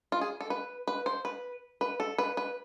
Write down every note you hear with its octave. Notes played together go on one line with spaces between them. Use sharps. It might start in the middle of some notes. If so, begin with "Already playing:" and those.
F4
G#4
A4
B4
B4
C5
B4
B4
A4
B4
B4